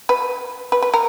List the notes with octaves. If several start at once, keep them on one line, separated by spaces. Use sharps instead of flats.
B4
B4
B4
A#4